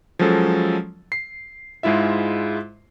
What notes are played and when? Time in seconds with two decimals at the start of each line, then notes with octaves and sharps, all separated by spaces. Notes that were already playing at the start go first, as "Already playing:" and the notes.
0.19 F3 F#3 G#3 C#4 A4
1.12 C7
1.83 G#2 G#3 E4 F4 E5